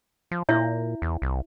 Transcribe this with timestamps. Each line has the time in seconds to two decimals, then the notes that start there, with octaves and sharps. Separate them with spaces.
0.31 F3
0.49 A#2 E4 C#5 E5
1.02 E2
1.22 C2